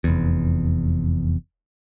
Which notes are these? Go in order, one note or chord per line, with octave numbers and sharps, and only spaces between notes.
F1 E2